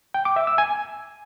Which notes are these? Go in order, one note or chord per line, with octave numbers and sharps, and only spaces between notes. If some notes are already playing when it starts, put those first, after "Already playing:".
G5
D6
E5
E6
G#5